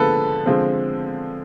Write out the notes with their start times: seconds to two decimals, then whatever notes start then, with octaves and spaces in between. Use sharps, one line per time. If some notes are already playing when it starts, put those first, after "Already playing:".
Already playing: D3 F3 G#3 B3 A4 B4
0.46 D3 F3 G#3 C4